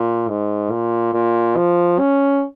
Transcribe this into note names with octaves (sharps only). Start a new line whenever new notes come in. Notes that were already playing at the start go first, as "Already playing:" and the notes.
Already playing: A#2
G#2
A#2
A#2
F3
C#4